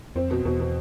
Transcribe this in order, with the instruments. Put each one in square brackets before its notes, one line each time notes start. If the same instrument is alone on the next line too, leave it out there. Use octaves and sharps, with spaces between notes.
[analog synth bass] F2 [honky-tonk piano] C4
[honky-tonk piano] B2
[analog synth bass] E2 [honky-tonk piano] B2
[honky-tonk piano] B2